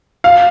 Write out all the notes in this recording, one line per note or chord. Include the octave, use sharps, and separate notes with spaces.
F5